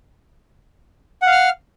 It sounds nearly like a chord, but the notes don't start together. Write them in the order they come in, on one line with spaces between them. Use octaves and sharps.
F#5 F5 F6